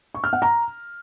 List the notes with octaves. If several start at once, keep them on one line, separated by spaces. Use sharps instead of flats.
C#6
F6
F#5
A#5